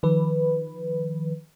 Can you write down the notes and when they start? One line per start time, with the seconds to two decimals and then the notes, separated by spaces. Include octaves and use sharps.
0.03 D#3 F3 B4